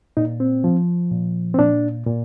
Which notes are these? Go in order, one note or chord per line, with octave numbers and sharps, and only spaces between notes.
A#2 D#4
C4
F3
A#2
C4
A#2 D4
A#2